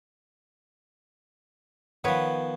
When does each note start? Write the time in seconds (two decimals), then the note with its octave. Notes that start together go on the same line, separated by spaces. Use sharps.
2.04 D#3 F3 B3 B4 C#5